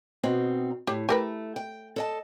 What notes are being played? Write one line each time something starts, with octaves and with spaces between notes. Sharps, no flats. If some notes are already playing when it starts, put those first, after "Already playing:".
B2 C4 D#4
A2 G4
A3 G4 A#4 B4
G5
A4 D#5 A5